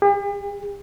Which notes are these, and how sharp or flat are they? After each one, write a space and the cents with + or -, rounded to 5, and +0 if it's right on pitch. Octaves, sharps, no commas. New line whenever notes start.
G4 +45